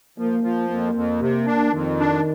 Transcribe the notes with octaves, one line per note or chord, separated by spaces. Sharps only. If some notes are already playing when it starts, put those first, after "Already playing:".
F3 A#3
F3
F2 A#3
F2
C3
D4
F2 D#3
D4